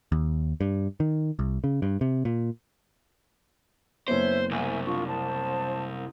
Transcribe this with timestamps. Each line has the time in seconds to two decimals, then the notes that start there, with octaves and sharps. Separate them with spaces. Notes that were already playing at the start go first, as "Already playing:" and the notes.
0.12 D#2
0.61 G2
1.00 D#3
1.39 C2
1.64 C#3
1.82 G2
2.01 C3
2.25 A#2
4.08 F#1 B3 C5 C#5 E5
4.51 C2 E5 G#5
4.85 D4 F4 C#6
5.07 C5 A5